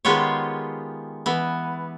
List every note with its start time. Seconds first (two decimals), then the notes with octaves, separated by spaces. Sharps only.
0.05 D#3 G#3 B3 F4 G4 C#5
1.26 E3 B3